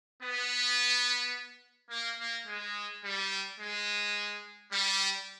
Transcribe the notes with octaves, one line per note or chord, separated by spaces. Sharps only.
B3
A#3
A#3
G#3
G3
G#3
G3